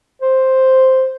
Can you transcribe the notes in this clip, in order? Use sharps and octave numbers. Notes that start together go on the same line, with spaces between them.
C5